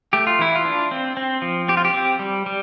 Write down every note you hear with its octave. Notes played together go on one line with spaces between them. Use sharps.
A3 G4
F4
E3 E4
F4
D4
C4
C4
F3
C4 G4
F4
G4
C4
G3
G3